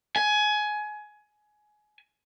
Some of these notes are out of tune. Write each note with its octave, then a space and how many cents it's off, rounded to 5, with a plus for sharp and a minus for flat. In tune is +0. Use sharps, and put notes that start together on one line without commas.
G#5 +20